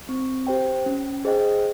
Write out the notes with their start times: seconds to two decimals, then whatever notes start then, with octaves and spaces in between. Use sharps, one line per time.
0.09 C4
0.47 G4 C5 G5
0.86 C#4
1.25 G#4 C5 D#5 G5